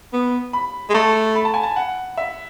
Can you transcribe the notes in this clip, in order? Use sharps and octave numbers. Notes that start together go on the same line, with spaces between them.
B3
B5
G#3
A3 A5
B5
A5
G#5
A5
F#5
E5